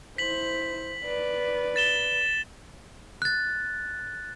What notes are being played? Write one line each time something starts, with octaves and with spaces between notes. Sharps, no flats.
E4 C5 B6 F#7
B4 D5
A6 E7 G7
F#6 A6